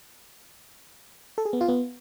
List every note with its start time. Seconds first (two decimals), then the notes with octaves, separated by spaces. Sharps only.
1.38 A4
1.45 G#4
1.53 B3
1.61 F4
1.68 B3